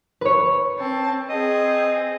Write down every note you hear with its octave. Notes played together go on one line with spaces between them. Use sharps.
B4 C#5
C4 A5
C4 G#4 D#5